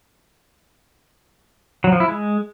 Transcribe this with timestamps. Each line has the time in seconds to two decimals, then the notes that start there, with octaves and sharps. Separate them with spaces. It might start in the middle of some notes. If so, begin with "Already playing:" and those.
1.84 F#3
1.92 F3
2.00 E4
2.08 G#3